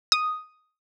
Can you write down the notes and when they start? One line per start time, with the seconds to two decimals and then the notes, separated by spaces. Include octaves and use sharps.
0.12 D#6